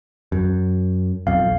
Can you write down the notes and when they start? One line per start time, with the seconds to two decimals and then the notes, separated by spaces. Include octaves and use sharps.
0.32 F#2
1.27 B1 F2 F5